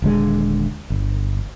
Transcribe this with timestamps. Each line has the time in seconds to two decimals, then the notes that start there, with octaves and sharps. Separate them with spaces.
0.02 D#1 D3 G#3
0.90 G1